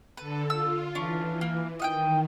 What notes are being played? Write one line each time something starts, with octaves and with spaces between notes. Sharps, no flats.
D3 A4 B4
F4 E6
E3 C#4 D4
A#3
D#3 D#5 F#5 G5